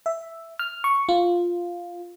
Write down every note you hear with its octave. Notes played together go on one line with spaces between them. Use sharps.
E5
F6
C#6
F4